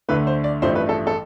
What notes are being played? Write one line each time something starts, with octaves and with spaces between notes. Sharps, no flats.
D2 D3 A3 B4
C5
D5
A1 G2 F3 A3 C5
B4
A4
A4